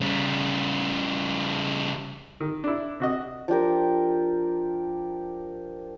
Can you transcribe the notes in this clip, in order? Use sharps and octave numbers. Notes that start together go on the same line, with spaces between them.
C#3 G3
D#3
D4 E4
C3 F#4 D#5
F3 D4 G4 A#4